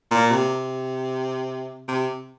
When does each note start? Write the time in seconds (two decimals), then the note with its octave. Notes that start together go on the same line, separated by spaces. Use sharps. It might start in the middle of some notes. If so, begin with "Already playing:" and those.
0.11 A#2
0.30 C3
1.88 C3